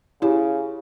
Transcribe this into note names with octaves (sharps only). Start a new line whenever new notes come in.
C#3 E4 G4